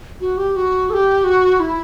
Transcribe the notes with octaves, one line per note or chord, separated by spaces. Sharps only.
F#4
G4
F#4
A4
G4
F#4
E4